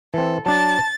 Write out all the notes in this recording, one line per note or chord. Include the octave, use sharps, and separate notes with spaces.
E3 C4 A4
F#3 D4 A5 A6